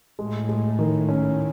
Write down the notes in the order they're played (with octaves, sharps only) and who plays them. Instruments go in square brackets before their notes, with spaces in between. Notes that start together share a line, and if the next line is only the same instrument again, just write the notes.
[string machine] A2 [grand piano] G#3
[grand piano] G#3
[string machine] A2 [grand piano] D#3
[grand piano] C#4